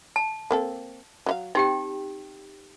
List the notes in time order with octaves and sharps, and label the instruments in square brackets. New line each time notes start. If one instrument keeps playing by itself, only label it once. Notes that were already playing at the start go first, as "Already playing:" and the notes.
[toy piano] A5
[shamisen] A#3 C4 A4
F#3 F4 F5
[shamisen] C4 [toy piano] D#4 G4 G5